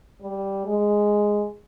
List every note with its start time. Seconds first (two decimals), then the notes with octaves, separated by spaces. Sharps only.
0.22 G3
0.65 G#3